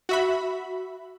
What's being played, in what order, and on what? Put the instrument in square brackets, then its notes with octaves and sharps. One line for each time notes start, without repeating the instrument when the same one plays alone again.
[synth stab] F#4 E5 B5